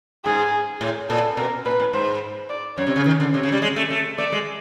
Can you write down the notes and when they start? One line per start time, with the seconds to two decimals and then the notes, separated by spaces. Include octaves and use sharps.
0.25 G#2 G#4
0.81 A2
1.09 A#2 A4
1.37 B2 A#4
1.65 A#2 B4
1.80 A2
1.93 G#2 C5
2.49 D5
2.78 F#2 C#5
2.87 C3
2.96 C#3
3.06 D#3
3.20 D3
3.34 C3 C#5
3.43 C#3
3.52 G3
3.62 G#3
3.76 A3
3.90 A3
4.18 A3 D5
4.32 G#3